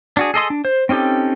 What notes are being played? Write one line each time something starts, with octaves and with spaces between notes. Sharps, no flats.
D4 F#4 G#4
G#4 A4 D#5 C6
D4
C5
C4 C#4 D#4 G4 A4